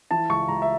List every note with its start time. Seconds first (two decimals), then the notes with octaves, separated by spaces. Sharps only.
0.11 E3 A5
0.29 C#2 C#6
0.48 C#2 A#5
0.62 E5